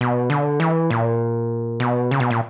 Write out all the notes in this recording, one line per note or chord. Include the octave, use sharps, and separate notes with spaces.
B2
D3
E3
A#2
B2
C#3
B2
A#2